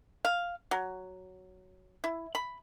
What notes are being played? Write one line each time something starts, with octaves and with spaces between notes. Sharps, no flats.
F5
F#3
E4
B5